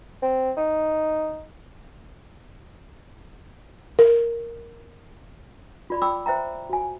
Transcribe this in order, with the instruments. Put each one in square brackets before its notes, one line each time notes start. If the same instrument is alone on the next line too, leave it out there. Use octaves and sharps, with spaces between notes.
[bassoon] C4
D#4
[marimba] A#4
[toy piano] F4 D5 B5
D5 G5 B5 D6 E6
C5 E5 G5 A#5
F#4 G#5